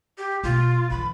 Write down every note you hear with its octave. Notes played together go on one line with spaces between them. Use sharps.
G4
B2 A#3 F4
D3 E3 B5